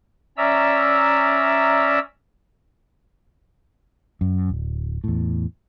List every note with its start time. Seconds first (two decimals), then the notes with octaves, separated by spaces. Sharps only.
0.37 C#4 D5 E5 A#5 E6
4.21 F#2
4.49 D1
5.04 E2 A2